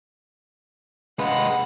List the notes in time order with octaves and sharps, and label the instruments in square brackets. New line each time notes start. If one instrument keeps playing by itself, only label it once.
[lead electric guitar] G#3 B4 [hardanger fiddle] F#5